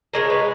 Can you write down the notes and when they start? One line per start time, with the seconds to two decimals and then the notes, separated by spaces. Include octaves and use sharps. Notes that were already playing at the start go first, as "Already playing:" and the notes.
0.14 C#3 G#3 A#4
0.30 B4